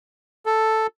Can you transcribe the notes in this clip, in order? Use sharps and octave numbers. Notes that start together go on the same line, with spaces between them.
A4